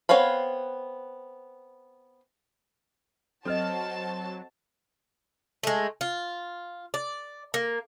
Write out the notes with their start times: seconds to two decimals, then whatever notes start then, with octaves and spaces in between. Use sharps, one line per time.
0.09 B3 C4 C#5 F5 B5
3.45 F#3 C4 F#4 A4 C5 D#5 A5 F6
5.63 G#3 A3
6.01 F4
6.94 D5
7.54 A#3